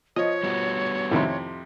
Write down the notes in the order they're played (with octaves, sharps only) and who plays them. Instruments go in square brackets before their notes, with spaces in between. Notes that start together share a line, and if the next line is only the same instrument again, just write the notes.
[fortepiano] F3 [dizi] C#5 [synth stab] D#5
[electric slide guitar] G3 B3 F#4
[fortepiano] F2 C3 [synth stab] A2 D#3 E4